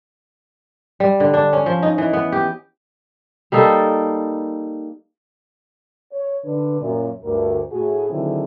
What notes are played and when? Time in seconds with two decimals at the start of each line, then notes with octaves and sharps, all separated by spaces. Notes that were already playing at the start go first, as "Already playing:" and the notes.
1.00 G3
1.20 D3
1.34 D4
1.53 C#4
1.66 F3
1.82 D#4
1.98 E3
2.13 B3
2.32 G4
3.52 G3 A#3 D#4 A4
6.13 C#5
6.45 D3 D4 B4
6.80 F#2 A#2
7.23 D2 G2 A#4
7.72 A2 F#4 G#4
8.09 D3 D#3 F#3 C4 E4 G#4